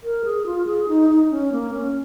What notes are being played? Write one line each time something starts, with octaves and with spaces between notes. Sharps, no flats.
A#4
G#4
F4
G#4
D#4
D#4
C#4
A#3
C#4